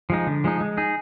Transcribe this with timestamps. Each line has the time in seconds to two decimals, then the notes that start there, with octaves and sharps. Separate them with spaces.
0.10 F3 G#3 D#4
0.27 D3
0.44 F3 G#3 D#4
0.60 G#3
0.77 D#4 G#4